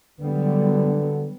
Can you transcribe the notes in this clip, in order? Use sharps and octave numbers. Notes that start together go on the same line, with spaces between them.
D3 F#3 G3 B3